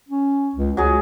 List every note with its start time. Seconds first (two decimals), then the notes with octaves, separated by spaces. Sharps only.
0.09 C#4
0.55 C#2
0.77 C#2 F#3 G#4